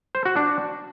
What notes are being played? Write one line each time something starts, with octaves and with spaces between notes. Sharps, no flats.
C5
F#4
D4